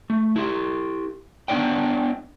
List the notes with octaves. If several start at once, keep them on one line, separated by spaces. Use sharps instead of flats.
A3
E4 G4
B3 D4 D#4 C#5 D5 G5